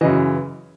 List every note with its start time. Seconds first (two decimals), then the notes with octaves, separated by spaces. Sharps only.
0.01 F#2 C#3 E3 D#5